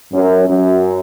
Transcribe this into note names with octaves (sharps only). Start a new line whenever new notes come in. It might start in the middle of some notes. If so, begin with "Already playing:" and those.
F#2
F#2